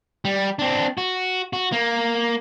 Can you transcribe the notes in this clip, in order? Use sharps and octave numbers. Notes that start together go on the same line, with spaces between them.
G3
C4 D4
F#4
F#4
A#3